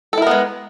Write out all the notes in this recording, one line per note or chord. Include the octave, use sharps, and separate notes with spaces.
G#3 B3 E4 A4 A#4